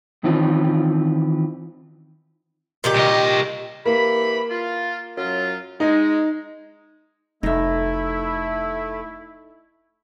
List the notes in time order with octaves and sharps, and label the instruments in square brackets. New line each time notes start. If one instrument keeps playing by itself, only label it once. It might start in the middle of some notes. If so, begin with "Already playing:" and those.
[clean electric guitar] D#3 E3 C4 C#4 F4
[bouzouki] A#2 D#3 G4
[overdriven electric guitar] C2 D#5
[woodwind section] E3 G4 B5 [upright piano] A#3
[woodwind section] F4
F#2 F#3 F4
[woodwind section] G#3 [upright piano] D#4
[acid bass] F1 [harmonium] A3 [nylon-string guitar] D#4 E5 [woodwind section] E4